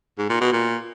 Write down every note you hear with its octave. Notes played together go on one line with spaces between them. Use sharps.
G#2
A#2
B2
A#2